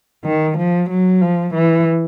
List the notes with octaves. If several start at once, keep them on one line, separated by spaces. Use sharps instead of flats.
D#3
F3
F#3
F3
E3